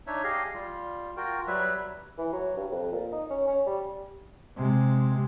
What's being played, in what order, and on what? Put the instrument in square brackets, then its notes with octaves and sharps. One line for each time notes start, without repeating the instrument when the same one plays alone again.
[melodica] D4 D#4 C#5 E5
G4 G#4 D#5 F5
G3 F4
F4 F#4 A#4 G5
F#3 G3 B4 E5
[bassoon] E3
F#3
G2
F2
A#2
D#4
C#4
C#4
G3
[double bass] C3 G#3